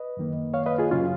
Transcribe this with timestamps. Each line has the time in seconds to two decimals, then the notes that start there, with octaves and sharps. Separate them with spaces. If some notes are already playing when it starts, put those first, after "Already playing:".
Already playing: B4 D#5
0.17 F#2 D#3 A#3
0.54 C#5 F5
0.66 B4 D#5
0.78 F4 G#4
0.91 F#2 C#3 F#3 C#4 F4